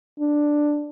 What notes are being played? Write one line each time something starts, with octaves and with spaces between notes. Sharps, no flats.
D4